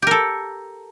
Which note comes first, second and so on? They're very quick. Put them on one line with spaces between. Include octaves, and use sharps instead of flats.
G4 A#4 A4